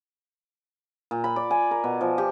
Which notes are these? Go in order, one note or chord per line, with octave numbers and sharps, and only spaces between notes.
A#2
B5
D5
G#5
A#4
B2
F3
G4